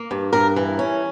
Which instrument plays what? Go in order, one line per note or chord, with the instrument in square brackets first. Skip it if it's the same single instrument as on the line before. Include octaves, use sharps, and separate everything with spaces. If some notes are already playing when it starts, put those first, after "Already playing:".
Already playing: [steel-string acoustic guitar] A#3
G2
G2 A#4
E3
C#4